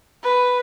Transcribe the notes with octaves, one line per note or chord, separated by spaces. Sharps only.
B4